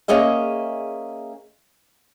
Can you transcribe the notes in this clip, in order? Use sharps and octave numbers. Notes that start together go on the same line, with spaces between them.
A#3 C#4 G#4 D#5 E5